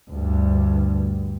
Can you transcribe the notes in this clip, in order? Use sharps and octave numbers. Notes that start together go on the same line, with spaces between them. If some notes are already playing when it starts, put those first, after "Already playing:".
D2 G2